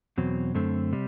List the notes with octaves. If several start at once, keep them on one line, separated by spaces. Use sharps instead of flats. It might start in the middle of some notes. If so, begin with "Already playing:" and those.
E2 B2 F#3 C4
F#2 D3 A3 C4
C3 G3